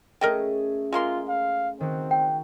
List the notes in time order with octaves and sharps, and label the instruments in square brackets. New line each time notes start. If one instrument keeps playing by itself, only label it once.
[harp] A3 C#4 G#4 [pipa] A#4 D#5 G5
[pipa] G#3 A#3 C6 [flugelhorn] F4
[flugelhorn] F5
[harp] D#3 F#4 [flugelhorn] C4
[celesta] G5